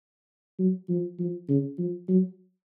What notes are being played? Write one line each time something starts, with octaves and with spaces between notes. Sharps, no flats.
F#3
F3
F3
C#3
F3
F#3